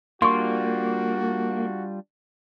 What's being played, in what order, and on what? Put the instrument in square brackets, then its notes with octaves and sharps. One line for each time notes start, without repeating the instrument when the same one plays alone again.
[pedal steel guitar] G3 D4 F4 [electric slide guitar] A#3 [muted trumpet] F#4 [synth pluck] C6 C#6